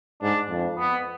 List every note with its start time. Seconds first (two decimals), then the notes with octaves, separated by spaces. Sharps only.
0.23 G#2 D4
0.50 F2
0.79 B3